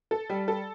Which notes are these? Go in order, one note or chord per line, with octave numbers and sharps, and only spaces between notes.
A4
G3
A4